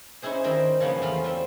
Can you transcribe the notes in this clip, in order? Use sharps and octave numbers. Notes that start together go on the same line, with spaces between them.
C#4 D#4 E4 G#4 C5
D#3 G3 C4 A#4
C#3 F3 A#3 B3 C#4
E2 A3 A#3 F4 F5 B5
G3 C4